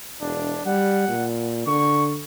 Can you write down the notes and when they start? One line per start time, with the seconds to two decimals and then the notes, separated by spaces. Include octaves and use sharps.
0.21 E1 D4
0.66 G3 F#5
1.08 A#2
1.67 D3 C#6